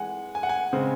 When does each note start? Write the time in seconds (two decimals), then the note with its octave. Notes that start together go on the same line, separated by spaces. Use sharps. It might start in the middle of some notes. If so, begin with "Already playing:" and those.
Already playing: E3 G#3 F#5 G#5
0.35 G#5
0.43 F#5
0.49 G#5
0.73 C#3 G#3 C4